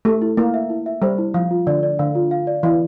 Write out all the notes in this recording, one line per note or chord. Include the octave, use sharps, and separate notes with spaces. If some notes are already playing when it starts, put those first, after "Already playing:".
A3 G4
E4
A#3 E4
E5
E4
E5
G3 C5
E4
F3 F5
F4
D3 D5
D5
D3 F5
F4
F5
D5
E3 F5